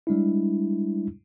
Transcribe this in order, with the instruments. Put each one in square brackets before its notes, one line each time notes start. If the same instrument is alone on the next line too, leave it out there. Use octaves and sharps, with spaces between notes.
[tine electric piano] G3 G#3 D4 E4